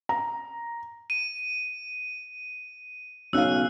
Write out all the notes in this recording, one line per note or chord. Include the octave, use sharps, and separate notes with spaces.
A#5
D#7
B1 C#4 F5 E6 F#6